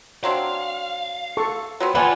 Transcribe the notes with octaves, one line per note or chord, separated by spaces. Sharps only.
F#3 C4 D4 F5
A4 C#6
F#3 B3 C4
D#2 G3 F4 B4 D5 F#5 G#5 A5